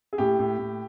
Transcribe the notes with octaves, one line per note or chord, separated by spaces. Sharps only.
G#4
A2 G4
A2
A2